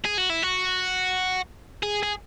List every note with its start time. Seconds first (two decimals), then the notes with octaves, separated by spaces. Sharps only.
0.05 G#4
0.18 F#4
0.30 E4
0.43 F#4
1.83 G#4
2.03 G#4